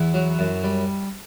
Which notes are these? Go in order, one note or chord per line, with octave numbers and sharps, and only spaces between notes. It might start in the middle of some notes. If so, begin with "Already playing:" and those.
Already playing: E2 E4
F#3
F#2
G3